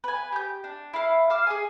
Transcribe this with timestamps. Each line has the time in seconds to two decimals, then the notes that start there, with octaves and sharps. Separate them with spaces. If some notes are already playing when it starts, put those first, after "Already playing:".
0.04 B4 G#5
0.32 G4 G6
0.64 D4
0.93 E4 F5
1.30 F5 D6 E6 F6
1.47 G#4 G#5